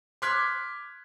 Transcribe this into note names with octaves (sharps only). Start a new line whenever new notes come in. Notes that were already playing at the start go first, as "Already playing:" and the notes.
C6 D6 F6 F#6 G#6 B6